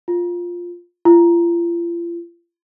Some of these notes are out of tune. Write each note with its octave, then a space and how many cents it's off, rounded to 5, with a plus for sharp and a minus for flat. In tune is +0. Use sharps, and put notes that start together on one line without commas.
F4 +5
F4 -40